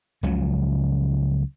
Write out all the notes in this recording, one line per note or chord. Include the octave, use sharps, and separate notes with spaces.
C#2 C#3 F3 F#3